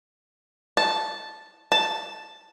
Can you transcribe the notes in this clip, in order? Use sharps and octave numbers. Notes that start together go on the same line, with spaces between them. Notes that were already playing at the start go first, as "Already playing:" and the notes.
A5
A5